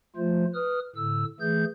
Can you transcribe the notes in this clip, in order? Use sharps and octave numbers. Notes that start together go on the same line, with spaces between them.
F3 A3 F4 C5
B4 D#6 F6
A2 D3 E6
E3 A3 G#4 G6